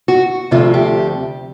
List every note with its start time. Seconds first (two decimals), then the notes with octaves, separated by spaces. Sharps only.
0.08 F#4
0.51 D2 C3 F3 A3 F4
0.74 G4